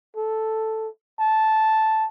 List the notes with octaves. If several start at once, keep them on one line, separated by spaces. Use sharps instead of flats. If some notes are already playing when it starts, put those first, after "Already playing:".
A4
A5